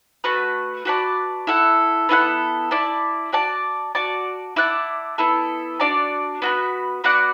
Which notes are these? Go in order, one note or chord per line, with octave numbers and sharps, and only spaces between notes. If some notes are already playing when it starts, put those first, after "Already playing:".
A3 F#4 B4 F#5
F#4 B4 D5 A5
E4 A4 F#5
B3 E4 A4 F#5
E4 D5 A5
F#4 D5 A5
F#4 D5 A5
E4 D5 F#5 A5
B3 E4 A4
D4 F#4 D5 A5
B3 F#4 B4
B3 F#4 D5 F#5